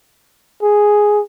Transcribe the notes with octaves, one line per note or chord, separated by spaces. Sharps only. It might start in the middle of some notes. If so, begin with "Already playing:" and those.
G#4